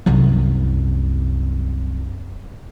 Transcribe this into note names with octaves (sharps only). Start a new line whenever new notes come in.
C2 F#2